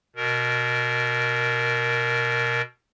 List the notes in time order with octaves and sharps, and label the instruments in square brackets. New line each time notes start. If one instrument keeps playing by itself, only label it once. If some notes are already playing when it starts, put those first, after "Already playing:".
[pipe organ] B2 A#4